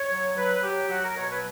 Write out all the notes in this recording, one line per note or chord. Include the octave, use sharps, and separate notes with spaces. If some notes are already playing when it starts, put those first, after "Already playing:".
Already playing: C#5
F#3
F#3 B4
F#3 G4
F#3 F#4
A#4
B2 C#5
B4